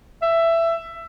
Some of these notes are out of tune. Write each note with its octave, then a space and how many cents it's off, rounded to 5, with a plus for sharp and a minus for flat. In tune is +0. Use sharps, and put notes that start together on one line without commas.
E5 +15